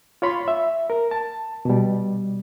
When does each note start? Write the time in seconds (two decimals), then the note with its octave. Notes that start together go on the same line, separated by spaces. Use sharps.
0.22 F4 C#5 B5 C6
0.48 E5
0.90 A#4
1.11 A5
1.65 B2 G3